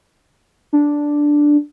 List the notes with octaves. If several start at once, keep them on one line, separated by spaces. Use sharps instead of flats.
D4